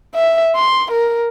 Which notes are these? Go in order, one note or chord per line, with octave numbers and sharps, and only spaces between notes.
E5
C6
A#4